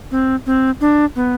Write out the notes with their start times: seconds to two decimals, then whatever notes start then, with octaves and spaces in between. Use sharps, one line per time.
0.11 C4
0.46 C4
0.81 D4
1.16 B3